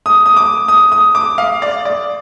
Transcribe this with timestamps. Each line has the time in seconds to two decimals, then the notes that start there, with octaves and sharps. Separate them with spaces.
0.06 D#6
0.26 D#6
0.37 D6
0.68 D#6
0.92 D#6
1.15 D6
1.38 F5
1.62 D5
1.85 D5